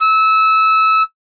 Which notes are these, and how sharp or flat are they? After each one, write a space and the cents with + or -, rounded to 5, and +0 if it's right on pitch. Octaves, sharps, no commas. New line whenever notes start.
E6 -20